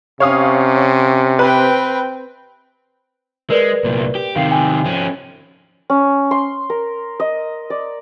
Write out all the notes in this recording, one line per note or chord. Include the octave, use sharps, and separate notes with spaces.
C3 C#4 C#5 F5 D#6
C4 B4 G5
G#3 A#4 B4 D5
C2 A#2
G4
C3 D#3 F5 G5 C7
G5 G#5
F3 C#4
C#4
C6
A#4
D#5
D5